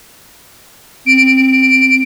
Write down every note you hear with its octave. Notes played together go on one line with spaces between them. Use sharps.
C4 D7